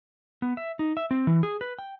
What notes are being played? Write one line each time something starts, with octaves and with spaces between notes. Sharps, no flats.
B3
E5
D#4
E5
C4
E3
G#4
B4
G5